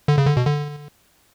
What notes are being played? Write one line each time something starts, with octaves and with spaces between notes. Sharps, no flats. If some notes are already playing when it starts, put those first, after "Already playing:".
D3
C#3
D3
B2
D3